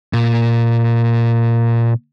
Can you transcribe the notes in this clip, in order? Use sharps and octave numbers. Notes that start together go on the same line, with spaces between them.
A#2